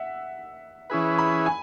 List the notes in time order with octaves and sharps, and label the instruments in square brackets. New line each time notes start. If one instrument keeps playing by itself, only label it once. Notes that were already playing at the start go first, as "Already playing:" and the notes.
Already playing: [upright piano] E5 F#5
[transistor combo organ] E3 C#4 E4 G#4 B4
[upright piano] B5
G#5